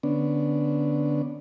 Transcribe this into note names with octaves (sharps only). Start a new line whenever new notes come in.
D3 B3 C#4 D4